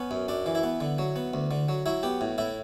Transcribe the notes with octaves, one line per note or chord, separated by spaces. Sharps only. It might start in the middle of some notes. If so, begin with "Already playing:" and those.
Already playing: B3 C#4
F#2
F#2 D4
E3
E4
B3
D3
F#3
B3
D2
D3
F#3
F#3 E4
B3 G4
A2
A2 E4